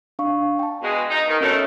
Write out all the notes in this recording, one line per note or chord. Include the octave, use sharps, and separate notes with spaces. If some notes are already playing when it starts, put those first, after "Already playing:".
D4 F5 C#6
G5 A5
B2 G#3
D#4
D#3
B2 D#3 A3 C#4 C#5